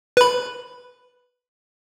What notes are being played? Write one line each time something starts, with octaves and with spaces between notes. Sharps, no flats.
B4 B5